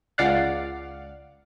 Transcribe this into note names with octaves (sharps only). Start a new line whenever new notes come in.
C#2 D5 F5 F#5